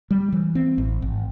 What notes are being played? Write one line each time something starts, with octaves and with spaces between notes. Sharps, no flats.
G3
E3
C4
A1
G#1